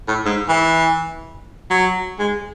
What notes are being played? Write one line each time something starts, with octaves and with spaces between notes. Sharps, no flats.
A2
G#2
E3
F#3
G#3